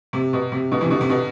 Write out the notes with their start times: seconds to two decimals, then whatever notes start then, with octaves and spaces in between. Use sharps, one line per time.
0.13 C3
0.33 B2
0.52 C3
0.71 B2 D3
0.81 C3 E3
0.90 B2 D3
1.01 C3
1.09 B2 D3